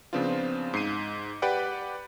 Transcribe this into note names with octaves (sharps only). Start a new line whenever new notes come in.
C#3 F3 B3 C4 D4 F4
G#2 C7 D#7
G4 B4 D5 F#5 G5